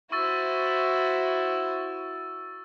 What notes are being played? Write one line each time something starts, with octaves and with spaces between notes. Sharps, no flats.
E4 F#4 C5 C#6 E6 A6